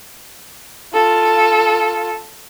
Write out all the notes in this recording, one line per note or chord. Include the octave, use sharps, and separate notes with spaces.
F4 A4